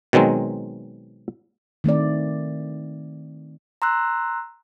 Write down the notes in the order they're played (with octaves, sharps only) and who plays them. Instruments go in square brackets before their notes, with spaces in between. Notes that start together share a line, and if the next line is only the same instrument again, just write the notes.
[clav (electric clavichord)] B2 D#3 F#3 G#3 C4
[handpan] D#3 A3 C4 D5
[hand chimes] A#5 C6 E6 F#6